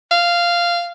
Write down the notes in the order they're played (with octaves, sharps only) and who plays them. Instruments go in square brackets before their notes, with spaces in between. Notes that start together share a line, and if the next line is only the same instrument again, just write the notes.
[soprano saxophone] F5